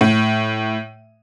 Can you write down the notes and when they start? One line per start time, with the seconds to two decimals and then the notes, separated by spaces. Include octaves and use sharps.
0.01 A2